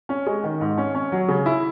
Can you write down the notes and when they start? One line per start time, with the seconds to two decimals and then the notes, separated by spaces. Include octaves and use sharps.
0.09 C#4
0.26 G#3
0.43 D#3
0.61 G#2
0.77 C#4
0.95 C#4
1.12 F#3
1.28 C#3
1.46 E4